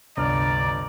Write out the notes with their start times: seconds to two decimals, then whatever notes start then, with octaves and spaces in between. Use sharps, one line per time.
0.17 G1 C#2 C3 D4 D5 A#5 F6